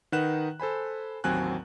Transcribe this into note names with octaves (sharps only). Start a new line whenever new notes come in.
D#3 D#4 B4 F#5 F#6 E7
A4 C5 G#5 B5
A1 D#2 F#3 C4 G#5 F#6